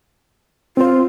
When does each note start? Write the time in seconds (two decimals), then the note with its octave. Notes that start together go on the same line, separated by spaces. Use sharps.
0.77 C4 F4 C5